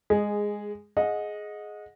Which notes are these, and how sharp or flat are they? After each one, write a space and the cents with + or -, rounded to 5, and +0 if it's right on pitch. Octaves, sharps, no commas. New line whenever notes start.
G#3 -10 G#4 +0
G#4 +15 D#5 +0 F#5 -30